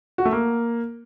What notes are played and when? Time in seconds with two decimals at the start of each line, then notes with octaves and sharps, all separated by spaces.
0.18 F#4
0.25 A3
0.33 A#3